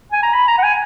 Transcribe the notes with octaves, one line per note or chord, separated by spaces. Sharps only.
G#5
A#5
B5
A#5
F#5
G#5